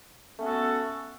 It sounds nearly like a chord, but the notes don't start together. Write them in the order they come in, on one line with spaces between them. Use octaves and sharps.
C#4 A3 B3 A4 F#4